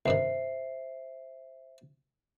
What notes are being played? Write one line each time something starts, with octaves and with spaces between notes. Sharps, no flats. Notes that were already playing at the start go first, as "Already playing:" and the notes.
C2 G2 D#3 C5 E5 C7